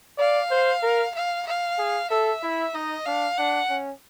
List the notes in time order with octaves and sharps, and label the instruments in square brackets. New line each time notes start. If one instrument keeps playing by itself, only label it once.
[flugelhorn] D5 [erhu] F5
[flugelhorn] C5
A#4
[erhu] F5
F5
[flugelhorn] G#4
[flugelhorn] A4 [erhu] E5
[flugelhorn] E4
[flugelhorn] D#4 [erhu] D#5
[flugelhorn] D4 [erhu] F5
[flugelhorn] D4 [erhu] F#5
[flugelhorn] C#4